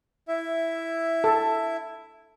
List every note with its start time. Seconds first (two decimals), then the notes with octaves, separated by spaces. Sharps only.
0.28 E4 E5
1.24 A4